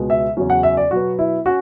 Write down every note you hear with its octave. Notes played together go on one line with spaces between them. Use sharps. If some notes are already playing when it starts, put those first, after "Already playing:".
Already playing: C#2 B2 G#3 B3
E5
E2 C#3 F#3 C#4
F#5
E5
D5
B2 F#3 B3 F#4
E4
C#4 F#4